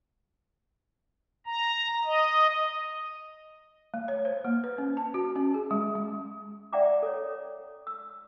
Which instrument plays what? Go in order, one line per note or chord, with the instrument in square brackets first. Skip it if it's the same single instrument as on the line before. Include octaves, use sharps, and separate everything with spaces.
[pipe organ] A#5
D#5
[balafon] A3
C#5
C5
A#3
B4
C#4
A5
F#4
C#4
G#4
G#3
G#3
[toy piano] D5 E5 F#5 G5 A#5 D6
A4 C#5
E6